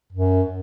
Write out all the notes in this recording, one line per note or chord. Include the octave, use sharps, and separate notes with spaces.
F#2